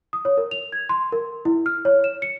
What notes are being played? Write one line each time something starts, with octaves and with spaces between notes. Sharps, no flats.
D#6
C#5
A#4
F7
G#6
C6
A#4
E4
F6
C#5
E7
C#7